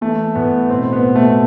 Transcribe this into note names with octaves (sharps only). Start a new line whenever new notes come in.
E3 A3
A2 B3
B2 C4
B3
B2
A3